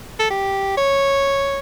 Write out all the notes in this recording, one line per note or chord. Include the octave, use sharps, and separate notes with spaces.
A4
G4
C#5